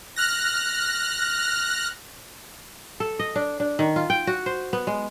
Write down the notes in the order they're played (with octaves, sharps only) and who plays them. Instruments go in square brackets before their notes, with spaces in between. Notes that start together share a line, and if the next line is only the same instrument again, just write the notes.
[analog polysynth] F6 F#6 A#6
[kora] A4
D#5
D4
D4
D#3
F4
G5
F#4
C5
B3
G#3